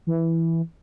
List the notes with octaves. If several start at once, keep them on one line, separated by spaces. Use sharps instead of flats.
E3